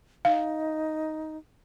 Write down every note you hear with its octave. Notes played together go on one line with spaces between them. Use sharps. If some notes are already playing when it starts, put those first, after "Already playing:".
D#4 F5